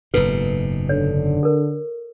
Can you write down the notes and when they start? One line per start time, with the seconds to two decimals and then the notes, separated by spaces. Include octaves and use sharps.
0.14 F#1 G#2 B2 D#4 A4 B4
0.89 D3 C#5
1.43 A4 A#4